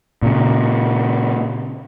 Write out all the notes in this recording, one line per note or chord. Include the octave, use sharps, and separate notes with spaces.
A#2 C#3